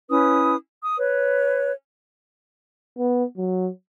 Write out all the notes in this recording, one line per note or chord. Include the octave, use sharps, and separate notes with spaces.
C#4 E4 B4 D#6
D#6
B4 C#5
B3
F#3